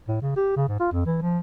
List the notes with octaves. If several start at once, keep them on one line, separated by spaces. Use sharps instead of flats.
A2
C#3
G4
C#3
G#2
F4
F2
E3
F3